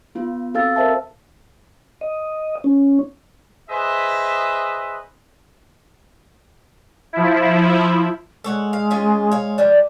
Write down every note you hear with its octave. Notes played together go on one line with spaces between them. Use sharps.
B3 F4
C4 F#4 A4 F5 E6 A6
A#4 C5 E5 A5
D#5
C#4
G#4 B4 C5 D#5 E5
F3 E4
G#3 A4 C#5 F#5
F5
C#4 F4 G#4
C#5 F5
F3 G3 D4